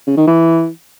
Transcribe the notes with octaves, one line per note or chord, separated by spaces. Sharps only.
C#3
D#3
E3